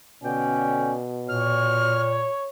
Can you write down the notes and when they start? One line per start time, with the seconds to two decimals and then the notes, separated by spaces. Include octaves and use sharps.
0.24 B2 D3 C#4 D5 G5
1.28 A#2 C#5 F6